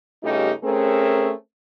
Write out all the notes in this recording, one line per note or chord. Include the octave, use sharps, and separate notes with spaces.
G2 C#3 A3 D#4 F4 G4
A3 C4 C#4 G#4 A#4